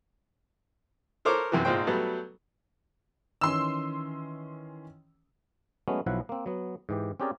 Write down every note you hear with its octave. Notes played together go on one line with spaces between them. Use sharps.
A4 A#4 C5 C#5 D6
F#2 C3 E3
G#1 A#2 G#3 C5 G5
F#3 G3 A3 B3
D#3 E3 C#4 C6 E6
F#3 G#3 A3 B3 C#4
B1 F3 F#3 E4 B4 F#5
A#3 C4
F#3 B3
G#2 E3 G4
C4 C#4 G4 G#4 A#4 D5